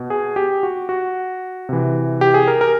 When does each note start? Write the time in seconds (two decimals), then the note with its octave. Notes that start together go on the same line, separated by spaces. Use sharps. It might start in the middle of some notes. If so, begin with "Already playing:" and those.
Already playing: B2
0.10 G#4
0.36 G4
0.63 F#4
0.89 F#4
1.69 C3 E3
2.21 G4
2.34 G#4
2.48 A#4
2.61 A#4